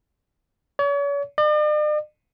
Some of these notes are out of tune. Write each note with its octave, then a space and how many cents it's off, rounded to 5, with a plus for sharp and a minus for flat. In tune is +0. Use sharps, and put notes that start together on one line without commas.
C#5 +40
D5 +45